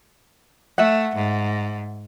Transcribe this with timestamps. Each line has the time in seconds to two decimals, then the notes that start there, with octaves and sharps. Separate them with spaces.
0.78 A3 E5 F#5
1.15 G#2